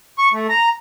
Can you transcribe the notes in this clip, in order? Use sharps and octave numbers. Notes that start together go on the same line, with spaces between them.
C#6
A3
A#5